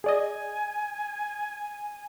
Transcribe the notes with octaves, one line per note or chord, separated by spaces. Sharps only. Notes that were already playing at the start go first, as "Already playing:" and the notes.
G#4 D5 D#5 G#5